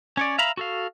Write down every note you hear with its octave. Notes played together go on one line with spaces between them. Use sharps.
C#4 C#5 D5
E5 F5 A#5 B5
F#4 A4 F5